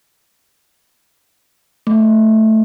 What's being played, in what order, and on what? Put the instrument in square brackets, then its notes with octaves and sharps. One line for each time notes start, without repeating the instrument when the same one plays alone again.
[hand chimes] A3